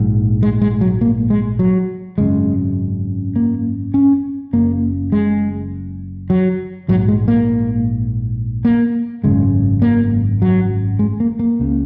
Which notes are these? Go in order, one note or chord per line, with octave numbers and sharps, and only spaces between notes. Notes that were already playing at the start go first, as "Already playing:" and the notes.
Already playing: A#1 G#2
G#3
G#3
F#3
A#3
G#3
F#3
G#1 F#2 C#3 G#3
A#3
C#4
F#1 F#2 C#3 A#3
G#3
F#3
A#1 G#2 F#3
G#3
A#3
A#3
G#1 F#2 C#3 G#3
A#3
F#3
G#3
A#3
A#3
C#2 C#3